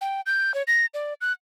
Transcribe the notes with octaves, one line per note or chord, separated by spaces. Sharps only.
G5
G6
C#5
A#6
D5
F#6